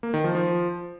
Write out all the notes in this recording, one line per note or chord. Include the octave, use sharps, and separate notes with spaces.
A#3
D#3
F3
F3